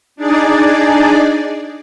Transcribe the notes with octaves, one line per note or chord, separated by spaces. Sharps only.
D4 D#4 G#4 D5